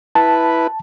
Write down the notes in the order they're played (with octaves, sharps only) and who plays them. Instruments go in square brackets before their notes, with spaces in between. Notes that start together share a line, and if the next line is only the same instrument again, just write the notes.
[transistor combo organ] E4 B4 [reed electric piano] A5